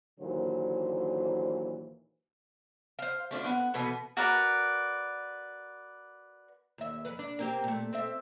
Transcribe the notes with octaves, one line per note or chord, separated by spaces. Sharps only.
D#2 A#2 D3 E3 F#3 C5
C5 F5
A3 C#4 D4 F4
B3 F#5
B2 E3 B3 A4
F#4 A#4 B4 D5
D#2 E5
F2 B4
D4
A#3 C4 G4
A#2 A3
C4 A4 E5